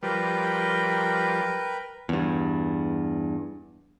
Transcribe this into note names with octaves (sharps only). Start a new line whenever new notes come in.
F3 G3 A#4 B4 G5
E2 G2